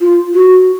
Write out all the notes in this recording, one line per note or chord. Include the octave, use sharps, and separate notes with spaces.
F4
F#4